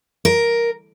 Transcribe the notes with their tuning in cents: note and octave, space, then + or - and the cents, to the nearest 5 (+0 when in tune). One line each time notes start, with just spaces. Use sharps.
A#4 +5